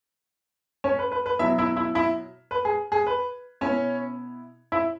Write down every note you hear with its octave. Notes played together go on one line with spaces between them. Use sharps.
C#4 C#5
B4
B4
B4
B2 F#3 B3 E4 E5
E4 E5
E4 E5
E4 E5
B4
G#4
G#4
B4
B2 B3 C#4 E4 C#5
E4 E5